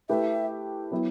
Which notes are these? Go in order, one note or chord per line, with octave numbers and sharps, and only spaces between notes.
A3 E4 G4 B4 E5
F#3 B3 E4